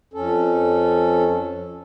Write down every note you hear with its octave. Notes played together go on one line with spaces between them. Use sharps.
F2 C#4 A4